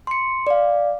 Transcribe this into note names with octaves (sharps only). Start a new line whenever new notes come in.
C6 C#7
D5 F5